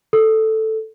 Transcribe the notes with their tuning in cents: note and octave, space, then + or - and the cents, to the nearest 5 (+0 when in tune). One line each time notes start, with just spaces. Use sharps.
A4 +0